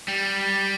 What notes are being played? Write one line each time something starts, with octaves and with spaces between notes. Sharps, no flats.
G3